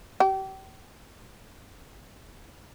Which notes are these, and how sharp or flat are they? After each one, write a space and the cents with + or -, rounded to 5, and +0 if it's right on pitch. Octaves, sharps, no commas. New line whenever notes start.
G4 -35